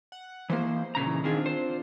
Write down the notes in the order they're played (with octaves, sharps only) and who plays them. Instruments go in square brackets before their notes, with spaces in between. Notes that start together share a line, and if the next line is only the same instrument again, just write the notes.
[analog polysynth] F#5
[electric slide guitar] E3 A#3 [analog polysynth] C5
[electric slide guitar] A#2 C#3 A#5
[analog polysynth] E3
[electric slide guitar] D#3 G#4 [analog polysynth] C4 D4 F4
[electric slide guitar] C5